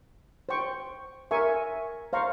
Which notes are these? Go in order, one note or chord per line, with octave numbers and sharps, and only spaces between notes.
C5 G5 C#6
A#4 E5 G#5 C#6
C5 F5 A#5 C#6